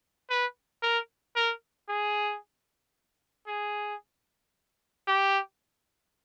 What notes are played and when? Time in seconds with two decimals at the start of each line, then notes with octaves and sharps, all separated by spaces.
0.30 B4
0.82 A#4
1.36 A#4
1.89 G#4
3.47 G#4
5.07 G4